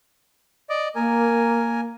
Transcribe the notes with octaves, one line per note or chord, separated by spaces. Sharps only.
D5 D#5 D6
A#3 A#4 G#5